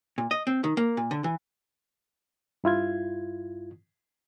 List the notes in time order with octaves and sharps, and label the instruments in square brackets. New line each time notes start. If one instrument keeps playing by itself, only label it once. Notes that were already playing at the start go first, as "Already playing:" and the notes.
[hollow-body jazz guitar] A#2
D#5
C4
D#3
A#3
A#2
D3
E3
[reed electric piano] G2 E4 F4 G#6